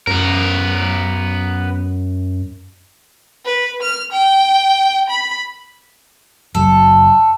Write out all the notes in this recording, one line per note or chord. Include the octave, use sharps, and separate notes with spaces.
F#2 B3 A#4
B4
F6
G5
B5
F#1 F#3 A4